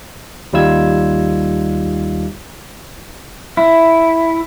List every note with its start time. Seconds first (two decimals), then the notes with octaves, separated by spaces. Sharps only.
0.53 D#2 G3 D#4 F4 E6 G#6
3.57 E4